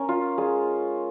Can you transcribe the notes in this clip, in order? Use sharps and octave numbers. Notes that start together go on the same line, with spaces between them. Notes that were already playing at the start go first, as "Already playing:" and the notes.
Already playing: C#4 A#4
F4
G#3